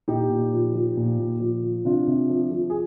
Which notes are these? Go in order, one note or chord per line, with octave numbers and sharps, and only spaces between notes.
A#2 D#4 G4
A#2
F3
F3
A#2
A#2
F3
F3
C3 D4 F4
C3
F3
F3
G#4